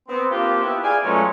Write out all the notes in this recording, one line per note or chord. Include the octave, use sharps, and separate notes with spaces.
B3 C4
A#3 C4 D4 F4 G4
B3 E4
G#4 D5 F5 G5 G#5
B2 F#3 G#3 A3 C#4 F4